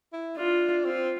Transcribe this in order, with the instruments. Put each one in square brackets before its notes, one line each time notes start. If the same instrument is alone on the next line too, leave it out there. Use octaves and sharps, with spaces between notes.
[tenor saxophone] E4
[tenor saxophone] D4 [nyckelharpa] F4
[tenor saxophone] C4 [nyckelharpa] F4